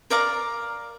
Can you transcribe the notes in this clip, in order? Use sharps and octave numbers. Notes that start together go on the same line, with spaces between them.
A#4 D5 F5 A#5